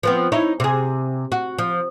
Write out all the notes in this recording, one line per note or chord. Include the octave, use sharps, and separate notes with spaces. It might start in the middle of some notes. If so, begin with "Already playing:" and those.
F3 B3 C4
D#4 E4 C#5
C3 G#4
F#4
F3